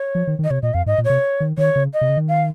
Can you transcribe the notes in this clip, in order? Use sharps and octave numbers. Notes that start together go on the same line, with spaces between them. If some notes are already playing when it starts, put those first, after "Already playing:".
Already playing: C#5
F3
D#3
D#3
D#5
C3 C#5
A#2 D#5
F2 F5
G#2 D#5
A#2
C3 C#5
D#3
D#3 C#5
C#3
D#5
C3
C#3
D#3
F5